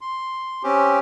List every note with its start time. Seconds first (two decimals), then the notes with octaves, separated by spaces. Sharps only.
0.01 C6
0.63 C4 C#4 G4